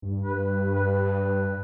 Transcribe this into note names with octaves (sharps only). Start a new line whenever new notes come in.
G2
B4
B4